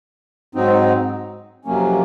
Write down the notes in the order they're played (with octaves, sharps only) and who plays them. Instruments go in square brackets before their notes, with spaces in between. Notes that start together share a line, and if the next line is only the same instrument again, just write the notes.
[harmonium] G#2 F#3 C4 D#4
F2 C3 F#3 A#3 C#4